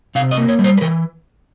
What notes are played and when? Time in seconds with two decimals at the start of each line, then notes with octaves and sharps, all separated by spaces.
0.15 C3 F5
0.31 D#5
0.37 A#3
0.48 C#5
0.59 G3
0.64 C5
0.77 B4
0.81 E3 A#4